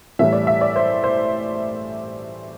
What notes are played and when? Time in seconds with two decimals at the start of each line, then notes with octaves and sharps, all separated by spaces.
0.19 A2 E3 G3 E5
0.33 D5
0.47 E5
0.61 D5
0.76 C5
1.04 C5